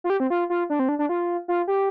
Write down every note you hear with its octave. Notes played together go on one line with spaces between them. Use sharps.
F4
G4
C4
F4
F4
D4
C4
D4
D4
F4
F4
G4